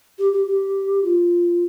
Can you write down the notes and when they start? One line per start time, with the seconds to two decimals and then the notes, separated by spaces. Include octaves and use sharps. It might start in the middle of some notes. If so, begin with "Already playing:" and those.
0.19 G4
0.33 G4
0.47 G4
1.04 F4